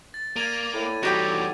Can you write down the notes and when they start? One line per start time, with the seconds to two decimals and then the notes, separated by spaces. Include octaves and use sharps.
0.14 A6
0.36 A#3 D5 G#6 A6 D#7
0.73 A2 E4
1.03 E3 G3 C4 D#4 F#4 G4 D#5 G5
1.33 B2